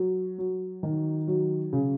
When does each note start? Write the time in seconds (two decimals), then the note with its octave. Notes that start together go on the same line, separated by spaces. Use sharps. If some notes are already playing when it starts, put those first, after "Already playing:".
Already playing: F#3
0.38 F#3
0.83 D#3
1.28 F#3
1.73 C#3